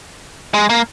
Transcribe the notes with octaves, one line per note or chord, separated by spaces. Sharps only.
G#3
A#3